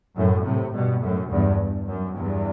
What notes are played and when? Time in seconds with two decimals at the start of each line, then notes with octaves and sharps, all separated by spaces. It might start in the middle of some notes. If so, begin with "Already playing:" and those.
0.16 F#2 A2
0.45 A2 C3
0.73 G2 B2
1.01 F#2 A2
1.30 E2 G2
1.87 F#2
2.16 E2 G2